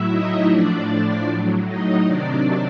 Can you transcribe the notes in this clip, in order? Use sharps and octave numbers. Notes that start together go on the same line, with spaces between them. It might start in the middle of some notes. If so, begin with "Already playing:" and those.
Already playing: A2 F#3 E4 E5
D#4 D#5
A2 F3 D4 D5
A2 F#3
D#4 D#5
C3 D#3 F#3 D4 D5